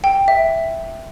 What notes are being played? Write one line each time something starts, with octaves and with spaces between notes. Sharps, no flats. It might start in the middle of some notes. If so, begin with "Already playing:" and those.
G5
E5